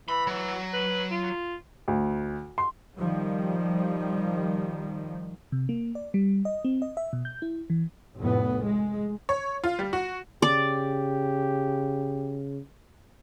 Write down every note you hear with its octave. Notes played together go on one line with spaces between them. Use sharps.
E3 B5
F#3
B4
F4
D2
C6
D#3 F3 G3
C3
A#3
D5
G3
D#5
C4
D#5
E5
B2
G6
E4
E3
F1 A2 B3
G#3
C#5
F4
G3
F#4
C#3 G4 D5